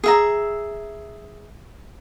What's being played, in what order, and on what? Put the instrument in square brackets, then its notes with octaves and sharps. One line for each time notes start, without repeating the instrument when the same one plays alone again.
[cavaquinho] G#4 E5 A#5